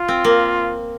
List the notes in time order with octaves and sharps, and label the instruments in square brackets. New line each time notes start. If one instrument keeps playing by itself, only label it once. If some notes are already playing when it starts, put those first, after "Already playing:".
Already playing: [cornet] F4
[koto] C4
A#3